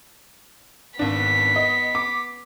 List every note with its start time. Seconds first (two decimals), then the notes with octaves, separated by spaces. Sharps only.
0.99 G#1 B3 D4 B6
1.56 D#5
1.95 D6